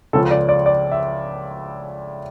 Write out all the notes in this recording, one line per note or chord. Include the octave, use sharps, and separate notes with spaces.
C#2 C#3 F3 A4
D5
D5
D5
E5